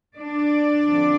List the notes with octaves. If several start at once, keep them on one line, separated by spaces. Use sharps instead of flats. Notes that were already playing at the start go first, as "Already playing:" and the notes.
D4 D5
F2 D3